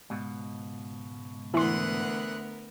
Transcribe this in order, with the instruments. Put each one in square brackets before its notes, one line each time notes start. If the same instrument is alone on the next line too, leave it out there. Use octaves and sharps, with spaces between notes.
[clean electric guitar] C#2 G#2 B2
[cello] D2 F#5 [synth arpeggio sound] E3 C6 [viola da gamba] B3 A#4